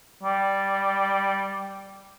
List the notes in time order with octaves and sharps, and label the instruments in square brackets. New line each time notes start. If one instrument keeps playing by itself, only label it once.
[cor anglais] G3